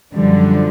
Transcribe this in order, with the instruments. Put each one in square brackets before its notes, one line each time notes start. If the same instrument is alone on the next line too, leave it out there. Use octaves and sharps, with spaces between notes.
[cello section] F#2 D3 F3 G3